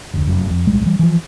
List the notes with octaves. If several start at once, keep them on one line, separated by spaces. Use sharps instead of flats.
F1 D2
F1 F#2
F2
D1 B1 G3 G#3
E3 G3
E3 F3